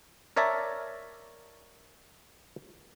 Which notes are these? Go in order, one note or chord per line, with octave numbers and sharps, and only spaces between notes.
A#4 C#5 D5 E5 A5 A#5